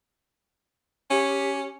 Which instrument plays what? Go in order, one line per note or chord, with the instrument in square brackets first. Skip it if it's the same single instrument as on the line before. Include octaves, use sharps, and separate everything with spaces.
[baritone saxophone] C#4 [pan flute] G4